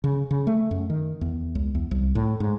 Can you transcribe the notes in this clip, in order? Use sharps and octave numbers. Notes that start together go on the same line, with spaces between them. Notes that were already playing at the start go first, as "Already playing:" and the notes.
C#3
C#3
A3
F#2
D#3
E2
C#2
E2
C2
A2
G#2